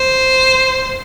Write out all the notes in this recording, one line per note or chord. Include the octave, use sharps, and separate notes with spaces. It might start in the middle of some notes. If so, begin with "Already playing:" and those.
Already playing: C5